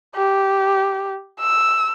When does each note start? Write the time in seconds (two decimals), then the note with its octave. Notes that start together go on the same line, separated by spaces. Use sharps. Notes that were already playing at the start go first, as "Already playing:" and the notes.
0.15 G4
1.40 E6